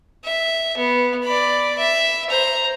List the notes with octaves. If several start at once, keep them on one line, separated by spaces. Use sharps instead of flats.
E5
B3
D5 B5
E5
C5 A#5